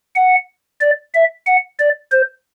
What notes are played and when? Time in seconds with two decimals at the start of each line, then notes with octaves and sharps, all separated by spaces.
0.16 F#5
0.81 D5
1.14 E5
1.47 F#5
1.79 D5
2.12 C5